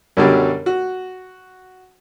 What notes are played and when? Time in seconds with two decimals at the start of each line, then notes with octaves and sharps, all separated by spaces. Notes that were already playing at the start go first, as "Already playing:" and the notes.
0.17 F#2 B2 D3 F#3 G3
0.66 F#4